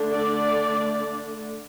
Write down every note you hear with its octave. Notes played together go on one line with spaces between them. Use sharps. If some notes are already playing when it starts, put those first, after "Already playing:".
Already playing: D3 A3 D4
D5